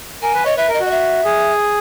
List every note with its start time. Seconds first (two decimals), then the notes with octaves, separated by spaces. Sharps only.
0.22 A#4 G#5
0.34 B4
0.45 C#5 D#5
0.57 B4 E5
0.68 A#4
0.74 D#5
0.80 F#4
0.86 D#5
0.91 E5
1.25 G#4